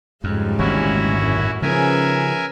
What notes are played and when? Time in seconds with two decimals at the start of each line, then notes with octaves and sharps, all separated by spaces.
0.24 F2 G#2 C#3 G3
0.59 G#1 D2 A#2 C#4 E4 F#4
1.19 F#2 A2
1.62 C#3 F3 C#4 G#4 A#4 B4 E5 G#5